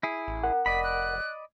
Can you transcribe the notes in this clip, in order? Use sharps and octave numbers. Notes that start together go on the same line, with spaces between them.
E4 G#4
A1
A#4 F#5
F1 D5 D#5 B5 B6
F#6